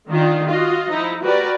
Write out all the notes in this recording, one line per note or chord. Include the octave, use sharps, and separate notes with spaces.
D#3 D4 D#4 F4
F4 F#4 D#5
F3 D#4 E4
F#4 G4 A#4 B4 D5